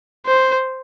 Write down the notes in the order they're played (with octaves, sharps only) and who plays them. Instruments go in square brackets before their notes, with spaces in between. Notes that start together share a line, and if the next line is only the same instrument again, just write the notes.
[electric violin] C5